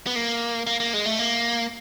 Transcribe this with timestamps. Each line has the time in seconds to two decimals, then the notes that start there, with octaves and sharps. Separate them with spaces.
0.07 B3
0.16 A#3
0.67 A#3
0.80 A#3
0.93 G#3
1.06 A3
1.19 A#3